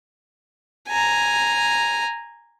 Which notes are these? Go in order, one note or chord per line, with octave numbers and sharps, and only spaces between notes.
G#5 A#5